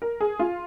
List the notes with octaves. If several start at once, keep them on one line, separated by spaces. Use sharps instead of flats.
A#4
G#4
F4